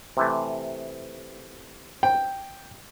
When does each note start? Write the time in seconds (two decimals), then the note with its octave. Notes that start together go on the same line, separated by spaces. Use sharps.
0.17 C3 E3 A3
2.03 G5